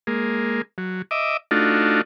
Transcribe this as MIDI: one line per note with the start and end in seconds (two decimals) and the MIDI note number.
0.07 0.62 56
0.07 0.62 58
0.78 1.02 54
1.11 1.37 75
1.11 1.37 76
1.11 1.37 86
1.51 2.01 57
1.51 2.01 62
1.51 2.01 63
1.51 2.01 65
1.51 2.01 66